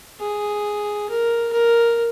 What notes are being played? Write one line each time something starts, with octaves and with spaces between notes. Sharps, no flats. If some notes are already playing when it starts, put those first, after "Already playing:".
G#4
A#4
A#4